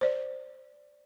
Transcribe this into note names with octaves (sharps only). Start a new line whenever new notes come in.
C5 D5